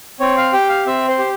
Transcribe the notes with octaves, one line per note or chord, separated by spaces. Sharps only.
C4 C#5
F5
G4 G5
F5
C4 E5
C5
G4